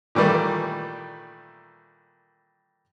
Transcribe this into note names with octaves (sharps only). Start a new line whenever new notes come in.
A#2 D#3 E3 G3 A3